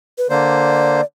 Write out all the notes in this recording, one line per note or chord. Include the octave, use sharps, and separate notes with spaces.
B4
D3 A#3 C5 D5